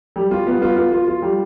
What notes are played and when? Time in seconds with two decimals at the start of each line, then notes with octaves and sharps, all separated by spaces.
0.16 G3
0.31 F4
0.47 B3
0.62 F4
0.76 F4
0.92 F4
1.08 F4
1.22 G3